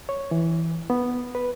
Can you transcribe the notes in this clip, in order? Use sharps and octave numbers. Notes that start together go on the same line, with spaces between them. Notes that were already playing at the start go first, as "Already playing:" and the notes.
C#5
E3
B3
B4